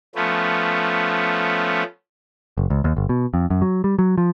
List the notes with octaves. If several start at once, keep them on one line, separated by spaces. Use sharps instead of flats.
F3 A3 B3 C#4
F#1
C#2
D#2
G1
B2
F2
F#2
F#3
G3
F#3
F3